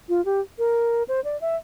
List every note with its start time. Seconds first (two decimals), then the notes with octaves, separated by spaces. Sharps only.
0.09 F4
0.25 G4
0.59 A#4
1.08 C5
1.24 D5
1.41 E5